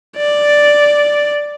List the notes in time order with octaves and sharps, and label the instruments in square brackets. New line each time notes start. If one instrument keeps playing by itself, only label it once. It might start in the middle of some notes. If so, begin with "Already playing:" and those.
[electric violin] D5